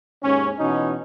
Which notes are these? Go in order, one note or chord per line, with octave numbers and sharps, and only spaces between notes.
D#2 G#2 C#4
B2 E3 C#4 D#4